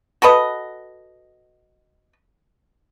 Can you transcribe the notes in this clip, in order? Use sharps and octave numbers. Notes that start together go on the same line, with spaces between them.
F#4 A4 B4 D#5